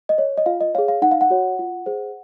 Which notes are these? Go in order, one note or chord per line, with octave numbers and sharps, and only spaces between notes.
D#5
C#5
D#5
F4 F5
D#5
G#4 C#5 F5
F5
D#4 F#5
F5
F#5
F#4 C#5
F4
G#4 C5